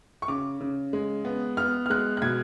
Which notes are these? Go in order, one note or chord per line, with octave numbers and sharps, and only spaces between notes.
C#6
C#3 D6
C#3
G#3
B3
B3 F6
F6
G#3 F#6
F#6
B2 G#6